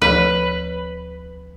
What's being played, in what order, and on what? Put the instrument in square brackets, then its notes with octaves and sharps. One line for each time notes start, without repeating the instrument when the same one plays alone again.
[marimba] D2 F3 C#5 [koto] B4